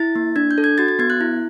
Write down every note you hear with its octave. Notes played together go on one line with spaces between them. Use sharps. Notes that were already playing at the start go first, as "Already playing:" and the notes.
Already playing: E4 A6
A#3
D4 G#6
G6
A4
G#6
F#4 A6
A6
B3 G#6
F#6
E4